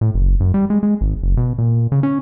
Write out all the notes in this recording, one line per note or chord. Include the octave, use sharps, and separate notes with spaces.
A2
F#1
F#2
G3
G#3
G#3
G#1
F#1
B2
A#2
C#3
C#4